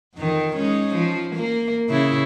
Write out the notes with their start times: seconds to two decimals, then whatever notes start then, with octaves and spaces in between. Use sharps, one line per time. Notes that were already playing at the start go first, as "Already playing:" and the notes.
0.15 F2 D#3
0.55 G#3 C#4 D#4
0.95 F3
1.35 A#3
1.89 C#3 E4